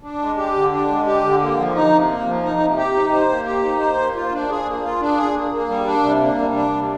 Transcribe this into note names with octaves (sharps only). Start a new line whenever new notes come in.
D4
G#3
G4
D3
D4
G#3
G4
D3
A#3
F3
D#4
C3
A#3
F3
D#4
C3
G4
D#4
C5
A#3
G4
D#4
C5
A#3
F4
D4
G#4
A#3
F4
D4
G#4
A#3
A#3
G3
D4
C3
A#3
G3
D4
C3